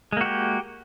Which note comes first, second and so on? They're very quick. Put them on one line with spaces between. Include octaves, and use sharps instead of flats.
G#3 A#3 F#4 G4